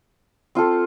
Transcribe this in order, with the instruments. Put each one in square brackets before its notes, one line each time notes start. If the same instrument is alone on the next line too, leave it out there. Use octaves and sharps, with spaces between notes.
[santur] C4 F4 A4